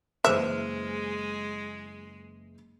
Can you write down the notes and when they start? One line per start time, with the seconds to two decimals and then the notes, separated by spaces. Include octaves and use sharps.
0.24 F#1 E3 G#3 G#4 B4 C5 E5 F6